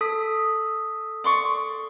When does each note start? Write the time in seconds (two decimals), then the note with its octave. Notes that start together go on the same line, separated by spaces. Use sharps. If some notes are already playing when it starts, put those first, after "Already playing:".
0.01 A4 D#6 B6
1.24 D5 C6 C#6